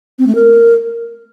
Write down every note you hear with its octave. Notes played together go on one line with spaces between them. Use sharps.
C4
A3
A#4